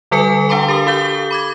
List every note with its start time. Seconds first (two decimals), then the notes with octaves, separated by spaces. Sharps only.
0.11 D3 G3 A4 B4 G#5 C#7
0.49 D4 F5 G5 A#5 C6 D6
0.68 G4 A#4 D#6
0.86 G4 A4 F5 G6 G7
1.31 B5 D6 G#6